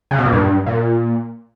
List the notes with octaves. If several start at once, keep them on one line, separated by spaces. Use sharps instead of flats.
C#3
B2
A#2
G2
A#2